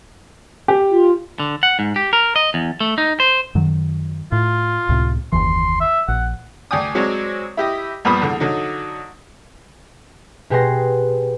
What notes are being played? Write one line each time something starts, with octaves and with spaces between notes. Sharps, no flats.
G4
F4
D3
F#5
G#2
G4
A#4
D#5
E2
A3
D#4
C5
F#2 D#3 F#3
A2 F4
C#2 A2 C3
F#1 D#2 E3 C6
E5
A#1 F#5
D2 D5 G5 G#5 D#6
F#3 G#3 C4 C#5 D5
E4 G4 D#5
A#1 G2 A#2 B3 B5 D#6
E2 D3
D3 F#3 D#4
B2 G4 G#4 F#5 C6 A#6